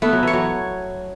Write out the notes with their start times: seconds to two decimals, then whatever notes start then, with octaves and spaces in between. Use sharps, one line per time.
0.02 A3 B3
0.13 F#3
0.23 E3 C#5
0.33 F#3